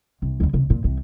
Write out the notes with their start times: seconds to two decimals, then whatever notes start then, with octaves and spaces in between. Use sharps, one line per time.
0.22 C2
0.40 D#2 D3
0.53 C#2 C3
0.70 A#2
0.84 C2 C3